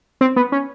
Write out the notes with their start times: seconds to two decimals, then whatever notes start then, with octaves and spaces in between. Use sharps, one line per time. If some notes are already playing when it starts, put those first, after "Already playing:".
0.21 C4
0.36 B3
0.52 C#4